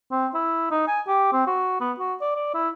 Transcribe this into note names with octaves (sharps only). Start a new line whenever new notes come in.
C4
E4
D#4
G#5
G4
C4
F#4
B3
F#4
D5
D5
E4